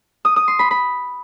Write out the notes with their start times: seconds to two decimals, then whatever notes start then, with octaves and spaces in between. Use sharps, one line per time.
0.25 D#6
0.36 D#6
0.48 C6
0.59 B5
0.71 B5